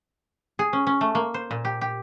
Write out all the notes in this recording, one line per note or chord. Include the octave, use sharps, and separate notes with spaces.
G#4
C#4
C#4
A3
A#3
C5
A#2
G4
G4